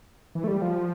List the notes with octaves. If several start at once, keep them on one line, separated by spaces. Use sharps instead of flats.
E3
A3
G3
F3